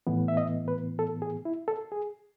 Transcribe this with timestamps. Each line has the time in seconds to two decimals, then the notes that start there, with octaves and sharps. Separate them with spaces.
0.07 A2 E3 B3
0.28 E5
0.37 D#5
0.68 B4
0.99 A4
1.22 G#4
1.45 E4
1.68 A4
1.92 G#4